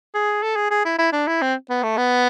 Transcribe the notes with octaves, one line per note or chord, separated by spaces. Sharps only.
G#4
A4
G#4
G#4
E4
E4
D4
E4
C4
B3
A3
B3